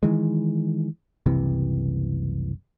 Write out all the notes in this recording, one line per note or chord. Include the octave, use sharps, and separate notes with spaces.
D#3 E3 G#3
F#1 C2 C3 E3